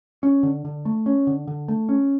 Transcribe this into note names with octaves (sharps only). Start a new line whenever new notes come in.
C#4
D3
D3
A3
C#4
D3
D3
A3
C#4